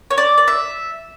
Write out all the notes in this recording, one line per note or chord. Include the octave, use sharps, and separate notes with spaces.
C#5
D5
D5
E5